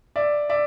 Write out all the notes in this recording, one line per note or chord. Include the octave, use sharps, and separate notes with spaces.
D5 E5
D5 E5